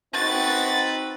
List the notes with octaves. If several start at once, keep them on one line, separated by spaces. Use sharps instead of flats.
C4 D#4 F#4 B4 A6